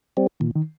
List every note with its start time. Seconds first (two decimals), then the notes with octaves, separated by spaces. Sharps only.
0.17 G3 C4
0.40 A#2 D#3
0.56 D#3